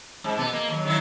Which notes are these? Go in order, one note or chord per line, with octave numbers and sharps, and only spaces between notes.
G#2
B2 B3
A#3
D#2 F#3
D#3 F#3 E4